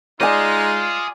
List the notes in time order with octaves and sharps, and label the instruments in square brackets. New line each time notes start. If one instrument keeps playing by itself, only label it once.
[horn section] G#3 D#4 [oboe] F4 [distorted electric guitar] G#4 D#5 [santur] D5 G#5